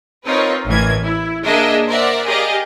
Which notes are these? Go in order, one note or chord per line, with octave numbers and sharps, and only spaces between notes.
C4 D#4 F4 A#4 B4 C#5
A1 E3 A#3 G#6
E4
A#3 D4 G#4 A#4 D#5 E5
A#4 C5 D5 E5 F#5
G4 G#4 A#4 D5 D#5 F5